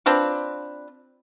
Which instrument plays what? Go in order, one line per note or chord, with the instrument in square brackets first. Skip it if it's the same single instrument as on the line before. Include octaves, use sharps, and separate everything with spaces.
[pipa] C4 D4 F4 B4